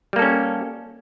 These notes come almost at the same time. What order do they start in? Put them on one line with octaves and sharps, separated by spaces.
G3 A#3 A4 C#4